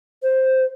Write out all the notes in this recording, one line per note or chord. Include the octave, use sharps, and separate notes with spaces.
C5